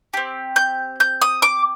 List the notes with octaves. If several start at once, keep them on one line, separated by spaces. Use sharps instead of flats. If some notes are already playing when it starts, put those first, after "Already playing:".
C4 G4
G6
G6
D#6
D6